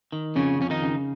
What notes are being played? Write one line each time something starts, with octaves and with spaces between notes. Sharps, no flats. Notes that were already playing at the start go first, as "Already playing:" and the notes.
D#3
F2 C#3 C#4
F2 C#4
D#3 D#4
C#3